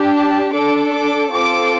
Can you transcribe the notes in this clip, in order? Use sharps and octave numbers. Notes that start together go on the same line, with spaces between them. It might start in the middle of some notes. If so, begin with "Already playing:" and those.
Already playing: D4 G4
A5
D4 A4 D6
D6
C4 F4 A4 D6